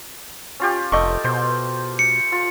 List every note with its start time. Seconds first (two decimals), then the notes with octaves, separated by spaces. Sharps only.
0.60 C#4 F4 G4
0.92 F1 A3 D#5 C#6 D6
1.24 B2 C5
1.99 C#7
2.32 F4